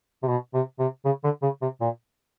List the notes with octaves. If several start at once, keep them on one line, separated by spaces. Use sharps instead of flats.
C3
B2
C3
C3
C#3
D3
C#3
C3
A#2